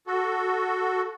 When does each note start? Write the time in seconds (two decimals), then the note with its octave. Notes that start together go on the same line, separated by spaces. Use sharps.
0.07 F#4 A4